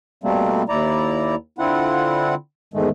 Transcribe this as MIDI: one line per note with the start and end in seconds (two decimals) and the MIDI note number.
0.24 0.63 47
0.24 0.63 55
0.24 0.63 57
0.24 0.63 58
0.24 0.63 60
0.69 1.35 39
0.69 1.35 64
0.69 1.35 74
0.69 1.35 82
1.58 2.35 50
1.58 2.35 60
1.58 2.35 64
1.58 2.35 65
1.58 2.35 78
2.74 2.89 40
2.74 2.89 44
2.74 2.89 51
2.74 2.89 56
2.74 2.89 57